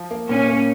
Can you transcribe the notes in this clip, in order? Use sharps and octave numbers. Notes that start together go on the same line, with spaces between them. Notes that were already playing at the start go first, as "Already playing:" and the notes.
Already playing: F3
A#3
A#2 C#4
A#3